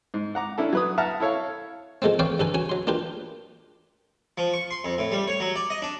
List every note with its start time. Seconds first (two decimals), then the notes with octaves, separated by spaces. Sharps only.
0.14 G#2
0.35 F#5 A#5 D6
0.58 C#4 D4 E4 A4
0.73 F#3 B4 D#6
0.98 E5 F#5 A5 A#5 F6
1.20 E4 A4 C#5 F5
2.02 F3 G#3 A3 B3 C4
2.19 C4 B4 C#5 D5 F5 G5
2.39 G2 D3 A4 B4 G#5
2.54 C#4 F#4 C#5 G#5
2.69 F#3 C6
2.87 A#3 D4 F4 G4 B4
4.38 F3
4.54 C#6
4.71 C6
4.85 F2
4.98 A2
5.12 G3
5.28 C#5
5.40 F#3
5.56 D5
5.70 D#5
5.82 D4